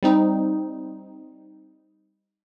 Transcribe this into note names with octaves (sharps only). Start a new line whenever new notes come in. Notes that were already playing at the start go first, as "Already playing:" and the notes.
G3 C4 D#4